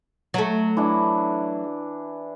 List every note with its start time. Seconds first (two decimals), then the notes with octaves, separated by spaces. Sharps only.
0.34 F#3 A3
0.77 E3 D4